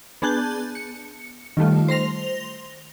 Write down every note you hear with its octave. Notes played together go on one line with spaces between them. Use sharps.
B3 D4 G#4 A5 F#6 G6
C#7
D#3 G3 A3 F4
C5 C6 A#6 F7